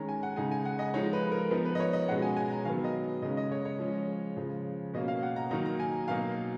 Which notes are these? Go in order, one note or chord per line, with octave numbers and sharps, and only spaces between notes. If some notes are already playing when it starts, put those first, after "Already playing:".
Already playing: D#3 G#3 C#4 A#5
G#5
F#5
C#3 G#3 D#4 G#5
G#5
F#5
D#5
F3 G#3 D#4 C#5
B4
A#4
F3 B3 D#4
B4
D#5
C#5
D#5
B2 G#3 C#4 F#5
G#5
G#5
A#5
D#3 F#3 B3 F5
D#5
C#3 G#3 C#4 D#5
D#5
C#5
C#5
F3 G#3 C#4
C#3 F3 G#3
B2 A#3 C#4 D#5
F5
F#5
A#5
D#3 F#3 A#3 D#4 A#5
A#5
G#5
B2 F#3 A#3 D#4 F5